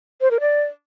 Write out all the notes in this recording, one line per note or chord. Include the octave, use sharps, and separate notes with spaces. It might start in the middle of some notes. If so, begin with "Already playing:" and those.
C5
A#4
D5